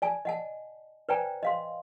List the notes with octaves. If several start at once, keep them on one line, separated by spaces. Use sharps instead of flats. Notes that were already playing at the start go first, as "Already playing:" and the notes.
D5 G#5 A5
D#5 F#5 A5
B4 C5 D5 G5 G#5 A#5
D#5 F5 C6